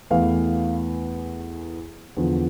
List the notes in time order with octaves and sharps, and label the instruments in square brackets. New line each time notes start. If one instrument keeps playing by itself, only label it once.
[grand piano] E2 E3 A3 F5
E2 D3 F3